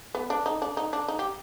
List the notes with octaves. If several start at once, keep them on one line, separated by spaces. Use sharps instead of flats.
B3
D4
D#4
D4
D#4
D4
D#4
G4